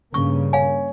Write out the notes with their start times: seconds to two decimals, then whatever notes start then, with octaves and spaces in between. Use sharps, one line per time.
0.14 G2 C#3 A#3 C#6
0.53 C#5 F5 G#5